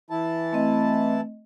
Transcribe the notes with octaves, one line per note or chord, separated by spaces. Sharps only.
E3 E4 A5
A3 C4 D#5